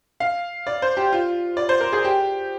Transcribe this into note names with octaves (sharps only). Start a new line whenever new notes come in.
F5
D5
C5
G4
F4
D5
C5
A#4
G#4
G4